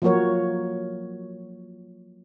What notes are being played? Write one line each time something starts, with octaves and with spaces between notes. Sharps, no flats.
F3 F#3 A#3 F#4 A#4 C#5